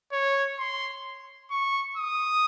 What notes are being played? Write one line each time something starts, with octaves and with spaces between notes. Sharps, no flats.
C#5
C6
C#6
D#6